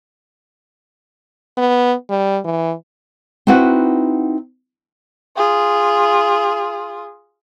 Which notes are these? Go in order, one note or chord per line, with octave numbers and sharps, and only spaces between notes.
B3
G3
E3
C4 D#4 E4 F#4 B4 F#5
F4 G#4